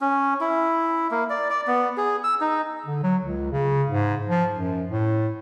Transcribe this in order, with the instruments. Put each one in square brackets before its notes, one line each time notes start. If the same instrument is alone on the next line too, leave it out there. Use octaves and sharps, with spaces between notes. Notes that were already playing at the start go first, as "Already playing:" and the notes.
[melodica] C#4
E4
A#3
D5
D5
B3
G#4
E6
D#4
[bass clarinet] D3
F#3
C#2
C#3
G#2
F3
F#2
A2